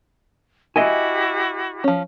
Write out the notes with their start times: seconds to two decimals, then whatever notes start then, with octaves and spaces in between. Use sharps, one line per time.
0.76 E4 F#4 G4 D#5 E5 G#5
1.84 F3 C#4